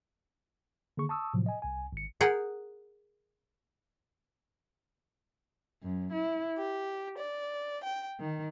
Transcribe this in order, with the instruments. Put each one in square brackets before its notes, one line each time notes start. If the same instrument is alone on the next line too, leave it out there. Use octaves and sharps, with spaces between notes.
[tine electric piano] D3 D#3 A#3 G#4 C#6
A5 C#6 D#6 E6
A2 C3 F3 F#3
D#5 G#5
C2 G#5
G#1 C#7
[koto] G#4 A#4 F#5 G5
[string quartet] F#2
E4
G4
D5
G5
D#3